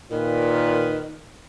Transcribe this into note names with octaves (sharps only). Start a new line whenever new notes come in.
A#2 D#3 B4